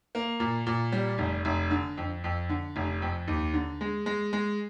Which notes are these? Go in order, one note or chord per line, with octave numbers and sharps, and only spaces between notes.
A#3
A#2
A#2
G3
F1
F1
D3
F2
F2
D3
F1
F2
D#2
D3
G#3
G#3
G#3